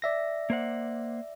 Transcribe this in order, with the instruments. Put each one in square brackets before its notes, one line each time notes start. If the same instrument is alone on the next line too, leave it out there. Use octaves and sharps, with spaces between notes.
[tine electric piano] D5 E5 A#6
[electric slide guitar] A#3 C5 F#5